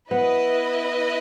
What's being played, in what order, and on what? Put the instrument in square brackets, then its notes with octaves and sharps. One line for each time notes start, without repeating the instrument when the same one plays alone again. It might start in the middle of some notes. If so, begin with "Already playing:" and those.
[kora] B3 [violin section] E4 B4 D#5